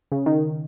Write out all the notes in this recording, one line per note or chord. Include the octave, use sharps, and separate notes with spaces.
C#3
D#3